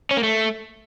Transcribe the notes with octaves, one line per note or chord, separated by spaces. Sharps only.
C#4
A#3
A3